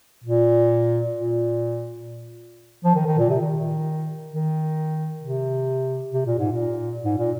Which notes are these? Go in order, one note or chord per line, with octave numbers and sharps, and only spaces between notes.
A#2
A#2
F3
D#3
D#3
A#2
C3
D#3
D#3
C3
C3
A#2
G#2
A#2
G#2
A#2